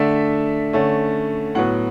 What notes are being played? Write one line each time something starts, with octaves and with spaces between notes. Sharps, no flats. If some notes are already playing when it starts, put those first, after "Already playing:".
Already playing: D3 A3 D4 E5
D3 A3 C#4
A2 F#3 B3 F#5